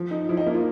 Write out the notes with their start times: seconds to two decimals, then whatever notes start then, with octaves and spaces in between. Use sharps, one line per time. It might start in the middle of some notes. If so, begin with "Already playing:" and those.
Already playing: F3
0.11 D#4
0.29 F3 E4
0.37 D#4
0.46 A#3 E4
0.54 F4